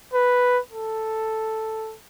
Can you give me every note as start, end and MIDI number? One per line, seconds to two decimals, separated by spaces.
0.14 0.59 71
0.71 1.95 69